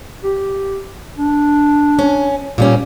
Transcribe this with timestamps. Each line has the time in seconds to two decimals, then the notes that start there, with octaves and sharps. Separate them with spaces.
0.24 G4
1.18 D4
1.99 C#4
2.58 A#2 G3 C#4